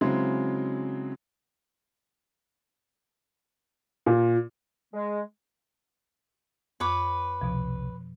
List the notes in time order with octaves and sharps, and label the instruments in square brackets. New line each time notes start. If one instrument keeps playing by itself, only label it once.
[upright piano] C#3 F#3 G#3 C4 E4
A#2
[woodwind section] G#3
[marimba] F2 [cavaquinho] B4 C#5 D6
[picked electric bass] C2 [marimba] B2 F3